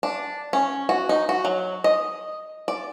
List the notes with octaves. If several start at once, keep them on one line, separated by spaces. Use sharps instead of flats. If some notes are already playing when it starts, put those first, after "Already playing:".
D4
C#4
F#4
D#4
F#4
F#3
D#5
D5